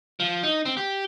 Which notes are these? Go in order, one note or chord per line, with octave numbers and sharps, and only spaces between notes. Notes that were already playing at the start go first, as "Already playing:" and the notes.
F3
D#4
C4
G4